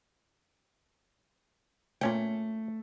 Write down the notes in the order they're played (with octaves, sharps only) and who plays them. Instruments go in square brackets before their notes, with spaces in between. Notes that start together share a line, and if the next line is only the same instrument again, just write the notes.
[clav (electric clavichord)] A#2 C#4 G5 [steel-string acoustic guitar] A3